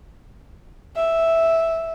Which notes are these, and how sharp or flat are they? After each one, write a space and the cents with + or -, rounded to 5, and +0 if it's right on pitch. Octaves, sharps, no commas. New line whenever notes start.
E5 -5